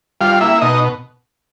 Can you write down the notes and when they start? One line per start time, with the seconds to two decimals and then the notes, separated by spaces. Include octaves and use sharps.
0.21 G3 F4 F5
0.41 A#3 E4 E5
0.61 B2 D#4 D#5